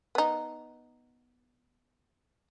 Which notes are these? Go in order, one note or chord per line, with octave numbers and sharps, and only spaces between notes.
B3 D#4